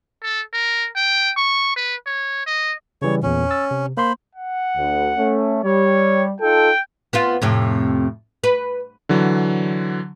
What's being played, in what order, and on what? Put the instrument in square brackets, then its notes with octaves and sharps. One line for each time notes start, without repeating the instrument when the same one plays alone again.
[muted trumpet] A4
A#4
G5
C#6
B4
C#5
D#5
[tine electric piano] C#3 E3 G3 [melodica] C#5
[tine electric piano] E2 A#2 [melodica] C#4
[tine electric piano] E6 A6
C3
[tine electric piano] A#3 C6 [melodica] C5 B5
[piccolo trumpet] F#5
[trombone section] D2
A3 C#4
[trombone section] G3 [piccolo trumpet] C#5
[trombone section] D#4 F4 A4 [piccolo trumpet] G5
[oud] B3 C4 F4
F2 A2 C3
B4
[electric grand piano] D3 E3 F#3